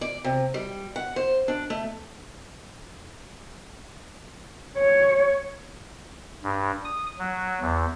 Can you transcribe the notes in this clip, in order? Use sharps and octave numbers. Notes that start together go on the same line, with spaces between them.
D5
C3
G3
F#5
C5
D4
A3
C#5
G2
D#6
F#3
E2